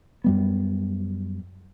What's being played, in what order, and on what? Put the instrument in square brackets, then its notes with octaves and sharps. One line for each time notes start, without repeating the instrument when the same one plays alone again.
[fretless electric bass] F#2 G3 B3